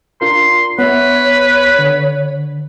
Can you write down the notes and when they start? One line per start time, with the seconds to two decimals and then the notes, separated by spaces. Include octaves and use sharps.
0.21 D4 F4 A#4 C6
0.79 B3 B4 C#5 E5
1.79 D3